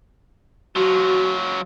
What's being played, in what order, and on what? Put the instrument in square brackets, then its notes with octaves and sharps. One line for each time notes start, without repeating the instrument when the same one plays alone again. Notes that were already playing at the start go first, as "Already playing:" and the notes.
[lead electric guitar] F#3 F4 [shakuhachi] F#4